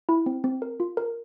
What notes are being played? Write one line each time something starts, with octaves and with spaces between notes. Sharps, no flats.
E4
C4
C4
A#4
F4
A#4